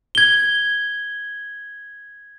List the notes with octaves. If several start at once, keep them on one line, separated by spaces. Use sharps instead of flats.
G#6 G7